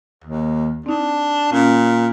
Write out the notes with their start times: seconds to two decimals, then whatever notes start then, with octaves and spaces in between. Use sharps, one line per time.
0.24 D#2
0.86 C4 D4 D#4
1.52 A#2 C#4